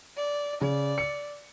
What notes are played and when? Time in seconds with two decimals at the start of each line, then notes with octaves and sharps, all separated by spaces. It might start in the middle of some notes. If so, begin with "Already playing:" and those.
0.17 D5
0.61 C#3 D5
0.98 C#7